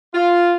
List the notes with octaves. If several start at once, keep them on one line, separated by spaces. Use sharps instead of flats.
F4